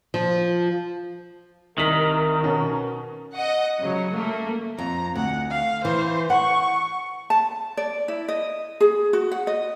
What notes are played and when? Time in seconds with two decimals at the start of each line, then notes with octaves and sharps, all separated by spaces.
0.14 F3
1.78 C2 D#3 A#4 B6
2.44 B2 C#4
3.33 D#5 F#5
3.81 C#3 F#3
4.14 A3 A#3
4.78 F2 A#5
5.15 D2 F#5
5.50 F5
5.85 E3 C5
6.30 F#5 C#6
7.30 A5
7.77 D5
8.08 E4
8.28 D#5
8.80 G#4
9.13 F#4
9.32 F#5
9.47 D#5